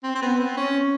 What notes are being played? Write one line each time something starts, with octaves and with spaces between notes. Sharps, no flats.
C4
C4
B3
C4
C#4